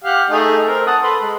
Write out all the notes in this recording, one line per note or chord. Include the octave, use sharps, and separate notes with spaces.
G4 F5 F#5
A3 D#4 G#4
C4 A#4
F#5 A5 D#6
A4 B4 C6
G#3